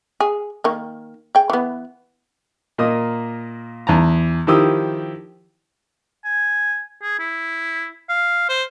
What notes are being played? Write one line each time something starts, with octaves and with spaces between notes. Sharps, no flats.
G#4
D#3 A#3
G#4 G5
E3 B3
A#2 A#3 D#5 D#6
E2 A5 A#5
D#3 F3 E4 G4 D#6 E6
G#5
G#4
E4
F5
C5